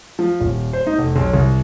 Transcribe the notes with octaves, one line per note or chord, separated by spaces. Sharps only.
F3
D#1
C5
D#4
F1
B1
C2